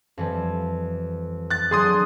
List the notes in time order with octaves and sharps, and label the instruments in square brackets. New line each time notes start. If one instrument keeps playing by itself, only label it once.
[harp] F2 E3 G3
[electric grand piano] F#6 A6
[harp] D3 F#3 D5 [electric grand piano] G#4 C6 D#6